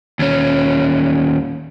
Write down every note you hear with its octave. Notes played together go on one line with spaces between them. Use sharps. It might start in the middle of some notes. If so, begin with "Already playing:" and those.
D#2 C#4